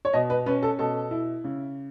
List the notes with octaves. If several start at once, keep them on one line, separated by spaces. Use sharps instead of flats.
C#5
B2 D#5
B4
C#4 B4
A4
B2 A4
E4
C#3